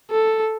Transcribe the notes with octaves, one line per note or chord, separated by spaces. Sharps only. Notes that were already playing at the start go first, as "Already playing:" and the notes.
A4